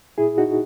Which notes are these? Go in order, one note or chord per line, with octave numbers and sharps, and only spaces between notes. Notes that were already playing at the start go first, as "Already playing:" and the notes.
A#2 E4 G#4
D#4 F#4